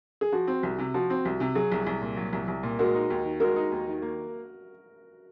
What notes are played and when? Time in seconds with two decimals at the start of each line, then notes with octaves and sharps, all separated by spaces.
0.21 G#4
0.32 F3 F#4
0.47 C4
0.63 C2
0.79 C3
0.94 F3 F#4
1.10 C4
1.25 C2
1.40 C3
1.55 F#3 G#4
1.72 C2
1.87 C2
2.01 A#2
2.17 F#3
2.33 C2
2.48 C2
2.63 A#2
2.79 G#3 F#4 A#4
2.95 D#4
3.10 D#2
3.25 D#3
3.40 G#3 F#4 A#4
3.56 D#4
3.72 D#2
3.87 D#3
4.02 A#3